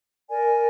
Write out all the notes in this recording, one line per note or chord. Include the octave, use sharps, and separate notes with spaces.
A#4 D5 G#5